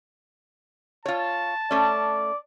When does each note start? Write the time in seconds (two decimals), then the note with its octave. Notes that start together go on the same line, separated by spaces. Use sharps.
1.06 F4 C#5 A5
1.71 A3 C#4 D5